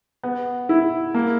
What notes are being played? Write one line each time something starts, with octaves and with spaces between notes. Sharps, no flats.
B3
E4
A#3